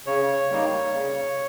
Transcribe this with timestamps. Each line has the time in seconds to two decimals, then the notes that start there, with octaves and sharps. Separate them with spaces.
0.06 C#3 C#5
0.50 G3 A#3 D#4
0.93 C#3